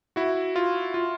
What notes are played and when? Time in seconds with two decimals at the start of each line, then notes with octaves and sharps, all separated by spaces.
0.16 E4 F#4
0.56 F4
0.94 F4